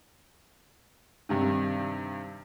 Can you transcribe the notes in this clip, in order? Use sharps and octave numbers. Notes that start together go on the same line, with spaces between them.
G2 C3 D#3